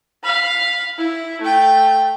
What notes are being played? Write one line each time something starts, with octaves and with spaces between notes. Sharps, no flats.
F5 B5
E4
A3 G5